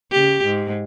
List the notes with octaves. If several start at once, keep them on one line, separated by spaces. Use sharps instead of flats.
C#3 G4
G#2